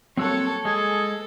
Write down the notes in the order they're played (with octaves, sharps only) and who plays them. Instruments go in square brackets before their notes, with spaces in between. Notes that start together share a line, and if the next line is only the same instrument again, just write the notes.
[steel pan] F#3 G3 A#3 [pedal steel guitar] C4 E6 F#6 [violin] A4 C#5
[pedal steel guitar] G#3 [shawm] G#4 [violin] A4